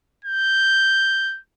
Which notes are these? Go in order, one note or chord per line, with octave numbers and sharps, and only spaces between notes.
G6